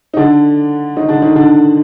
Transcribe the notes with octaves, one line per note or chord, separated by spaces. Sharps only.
D#4
D3 D4
D#3 D#4
D3 D4
D#3 D#4
D3 D4